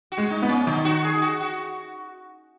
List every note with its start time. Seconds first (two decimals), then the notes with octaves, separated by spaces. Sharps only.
0.12 F#4
0.18 G#3
0.30 D#4
0.42 B3
0.48 C#4
0.67 D#3 D#4
0.85 F#4
1.04 G#4
1.22 F#4
1.40 F#4